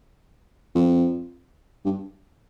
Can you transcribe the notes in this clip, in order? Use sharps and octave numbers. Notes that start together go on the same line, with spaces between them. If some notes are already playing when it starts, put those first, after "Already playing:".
F2
G2